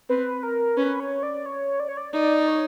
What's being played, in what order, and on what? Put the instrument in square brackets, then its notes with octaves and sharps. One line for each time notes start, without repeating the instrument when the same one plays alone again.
[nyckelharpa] C4 [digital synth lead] B4
[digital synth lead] A#4
[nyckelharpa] C#4 [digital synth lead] B4
[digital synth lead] C#5
D5
C#5
D5
C#5
D5
[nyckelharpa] D#4 [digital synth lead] D5
[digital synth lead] C#5